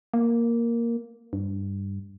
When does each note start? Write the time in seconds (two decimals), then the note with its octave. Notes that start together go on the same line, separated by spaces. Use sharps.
0.14 A#3
1.33 G2